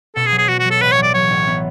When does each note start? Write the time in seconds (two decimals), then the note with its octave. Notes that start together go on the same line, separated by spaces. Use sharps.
0.16 B2 A4
0.26 G#4
0.32 F#3
0.38 G#4
0.49 F#3 F#4
0.59 F#4
0.65 F#3
0.71 A4
0.81 A1 B4
0.92 C#5
0.98 F#3 D5
1.14 F#3 C#5
1.30 A1
1.47 B3